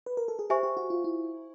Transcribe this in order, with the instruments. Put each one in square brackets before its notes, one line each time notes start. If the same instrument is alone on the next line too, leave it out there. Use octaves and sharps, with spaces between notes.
[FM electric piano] B4
A#4
A4
G#4
[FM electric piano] G4 [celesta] C5 E5 G#5 C#6
[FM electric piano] G4
F#4
F4
E4